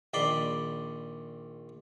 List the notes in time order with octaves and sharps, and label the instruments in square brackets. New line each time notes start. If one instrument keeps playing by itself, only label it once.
[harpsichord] A#1 D#3 D5 B5 C6